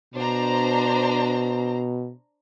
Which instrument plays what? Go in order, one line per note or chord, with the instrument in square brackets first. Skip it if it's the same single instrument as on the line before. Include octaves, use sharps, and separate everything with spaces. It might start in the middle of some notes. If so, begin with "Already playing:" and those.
[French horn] B2 [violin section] D4 C5 A#5